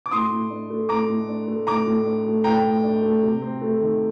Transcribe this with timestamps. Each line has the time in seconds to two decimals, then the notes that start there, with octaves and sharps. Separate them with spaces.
0.06 D6
0.11 A2 C6 D#6
0.31 A2
0.50 D4
0.70 A3
0.89 A2 A#5 D6
1.09 A2
1.29 D4
1.48 A3
1.67 A2 A#5 D6
1.87 A2
2.06 D4
2.25 A3
2.44 A2 G5 A#5
2.64 A2
2.84 D4
3.02 A3
3.23 C3
3.42 C4
3.61 A3
3.81 D#3